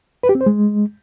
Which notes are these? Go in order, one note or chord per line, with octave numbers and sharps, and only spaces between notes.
B4
G4
C4
C5
G#3